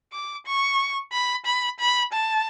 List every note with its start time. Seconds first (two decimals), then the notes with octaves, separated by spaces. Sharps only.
0.13 D6
0.46 C#6
1.12 B5
1.45 B5
1.79 B5
2.13 A5